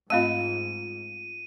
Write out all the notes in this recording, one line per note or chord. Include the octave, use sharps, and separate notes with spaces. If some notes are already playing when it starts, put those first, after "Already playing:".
G#2 A3 C4 F4 D#5 F5 A5 D#7